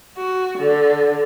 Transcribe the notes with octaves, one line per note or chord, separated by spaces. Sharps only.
F#4
D3